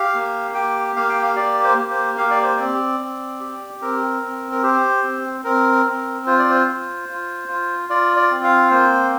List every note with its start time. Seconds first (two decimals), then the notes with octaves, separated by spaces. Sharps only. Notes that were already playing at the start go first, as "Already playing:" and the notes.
Already playing: G4 F5
0.15 A#3
0.54 G4 G5
0.96 A#3 F5
1.09 G5
1.23 F5
1.36 G4 D5
1.64 C5
1.77 A#3
1.90 C5
2.18 G4 F5
2.31 D5
2.43 C5
2.57 C4 D5
3.00 C4
3.40 G4
3.82 C4 A#4
4.22 C4
4.52 A#4
4.63 G4 C5
5.03 C4
5.44 C4 A#4
5.86 C4
6.26 F4 C5
6.39 D5
6.50 C5
6.67 F4
7.08 F4
7.48 F4
7.89 F4 D5
8.17 D5
8.31 C4
8.44 F5
8.71 A#3 C5